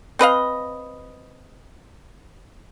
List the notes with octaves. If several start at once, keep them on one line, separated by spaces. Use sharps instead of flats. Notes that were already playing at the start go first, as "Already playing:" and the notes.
C4 B4 D#5 F5